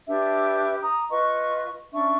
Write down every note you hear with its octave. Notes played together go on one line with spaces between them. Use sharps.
D4 G4 B4 E5
A#5 D#6
F4 B4 D#5 C#6
C#4 D4 E5 C#6